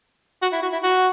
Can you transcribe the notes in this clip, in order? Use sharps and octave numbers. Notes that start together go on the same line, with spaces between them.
F#4
E4
F#4
E4
F#4